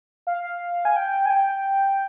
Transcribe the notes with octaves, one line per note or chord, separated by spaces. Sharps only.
F5
G#5
G5
G#5
G5